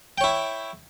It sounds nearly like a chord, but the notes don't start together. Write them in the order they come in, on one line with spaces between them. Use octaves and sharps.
G5 C#5 E4